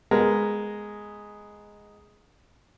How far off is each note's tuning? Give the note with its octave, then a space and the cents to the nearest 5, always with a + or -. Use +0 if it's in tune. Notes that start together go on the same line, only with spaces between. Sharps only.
G#3 +0 B3 +0 A#4 +0